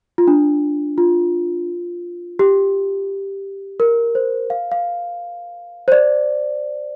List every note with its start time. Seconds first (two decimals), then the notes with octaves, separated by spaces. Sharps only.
0.18 F4
0.27 D4
0.98 F4
2.39 G4
3.80 A#4
4.15 C5
4.50 F5
4.72 F5
5.88 C5
5.92 D5